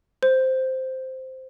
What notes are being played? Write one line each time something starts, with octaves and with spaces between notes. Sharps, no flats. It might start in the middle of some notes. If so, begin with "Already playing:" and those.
C5